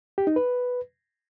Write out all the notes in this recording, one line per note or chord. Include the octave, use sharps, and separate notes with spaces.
G4
D#4
B4